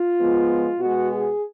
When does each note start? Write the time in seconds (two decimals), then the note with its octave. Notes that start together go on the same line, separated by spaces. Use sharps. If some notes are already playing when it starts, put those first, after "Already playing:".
Already playing: F4
0.20 F3 G#3 B3
0.80 B2 G#3 B3 F#4
1.11 G#4